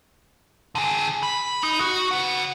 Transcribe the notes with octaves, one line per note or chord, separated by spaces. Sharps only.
D3 G#4
B5
D#4
F#4
C#3 F#5